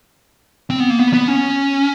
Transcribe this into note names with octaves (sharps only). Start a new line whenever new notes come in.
C4
B3
A#3
B3
B3
C#4